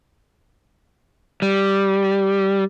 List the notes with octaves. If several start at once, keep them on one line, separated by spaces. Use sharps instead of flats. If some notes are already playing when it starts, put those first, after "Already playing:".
G3